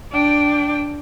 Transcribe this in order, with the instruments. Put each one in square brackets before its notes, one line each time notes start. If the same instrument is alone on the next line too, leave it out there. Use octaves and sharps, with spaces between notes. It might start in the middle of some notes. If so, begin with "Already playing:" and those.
[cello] D4 G5